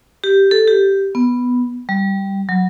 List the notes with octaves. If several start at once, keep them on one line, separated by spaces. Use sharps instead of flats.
G4
A4
G4
B3
G3
F#3